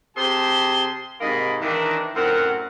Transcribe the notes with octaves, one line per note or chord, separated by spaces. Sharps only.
C3 G4 G#4 C5 A5 C6
G#2 C3 A#3 D#5 B5
D#3 E3 D4
F#2 A2 C4 A#4 F#5